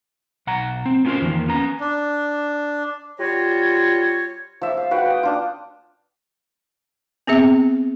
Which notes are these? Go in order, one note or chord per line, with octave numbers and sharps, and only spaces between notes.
B1 F#5 A#5
C4
B3 C#4 F4 F#4 A#4 C5
E2 D#3 F3 A#3
B3 C#4 A#5
D4
G3 F4 F#4 C#5
F3 E5
F5
F#4 B4 F#5 G5
G5 D#6
D4 F4
B3 C4 G#4 E5